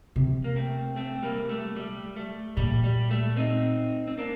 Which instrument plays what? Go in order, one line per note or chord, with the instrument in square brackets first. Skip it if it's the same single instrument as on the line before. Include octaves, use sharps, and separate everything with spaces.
[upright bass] C3
[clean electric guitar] A#3
A3 C4
A3 C4
G3 A#3
A3
G3
A3
[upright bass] A#2 [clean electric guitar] G3
[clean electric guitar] G3
A3
C4 D#4
C4
A#3 D4